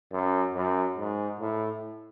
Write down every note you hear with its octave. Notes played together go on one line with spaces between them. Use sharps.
F#2
F#2
G#2
A2